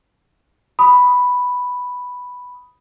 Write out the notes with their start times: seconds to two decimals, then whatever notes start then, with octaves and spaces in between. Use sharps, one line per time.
0.79 B5 D#6